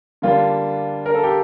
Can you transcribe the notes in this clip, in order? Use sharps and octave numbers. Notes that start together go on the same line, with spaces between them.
D3 G3 A#3 D4 F4
A#4
A4
G4